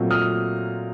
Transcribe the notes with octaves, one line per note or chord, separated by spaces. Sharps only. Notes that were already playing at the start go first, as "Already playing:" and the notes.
Already playing: A#2 F#3 A3 C4
D#6 F6